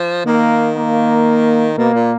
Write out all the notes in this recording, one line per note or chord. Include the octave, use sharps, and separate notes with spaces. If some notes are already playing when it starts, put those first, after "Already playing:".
Already playing: F3
D#3 A#3
A#3
B2 A#3
A#2